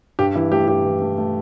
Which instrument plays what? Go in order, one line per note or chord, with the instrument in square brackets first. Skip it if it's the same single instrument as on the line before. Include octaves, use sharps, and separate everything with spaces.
[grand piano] G2 G4
E3 E4
A3 G4
G2 G4
E3
A3
A3